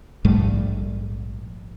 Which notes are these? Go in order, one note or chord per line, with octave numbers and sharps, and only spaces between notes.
A#1 G#2 G3 A3